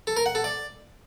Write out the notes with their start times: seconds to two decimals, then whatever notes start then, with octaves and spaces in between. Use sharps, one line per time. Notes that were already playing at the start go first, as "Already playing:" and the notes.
0.07 A4
0.17 A#4
0.26 F#5
0.35 A4
0.44 D5